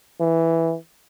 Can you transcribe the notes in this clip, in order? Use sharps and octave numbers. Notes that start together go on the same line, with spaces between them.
E3